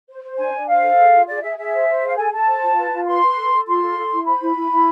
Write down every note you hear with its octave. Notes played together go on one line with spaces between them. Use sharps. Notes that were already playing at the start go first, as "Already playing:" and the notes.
C5
C5
D4 G#5
D4
C5 F5
A4
G#4
F4
G#4 D5
G#4 E5
G#4 E5
C5
C5
G#4
F5
A4 G#5
A4 A5
C5
F4
B4
F4
B4 C6
B4
A4
A4
F4 C6
A4
A4
E4
C5 B5
E4
E4
E4